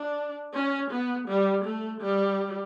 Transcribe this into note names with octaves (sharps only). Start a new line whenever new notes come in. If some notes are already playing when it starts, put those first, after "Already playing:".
Already playing: D4
C#4
B3
G3
A3
G3